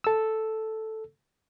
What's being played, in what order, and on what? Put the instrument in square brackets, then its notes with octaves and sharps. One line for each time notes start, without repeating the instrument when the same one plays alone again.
[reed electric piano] A4 E6